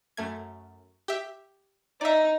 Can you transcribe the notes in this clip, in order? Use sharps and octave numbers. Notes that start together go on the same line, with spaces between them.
F#2 A3 G#6
G4 E5
D#4 D5 E5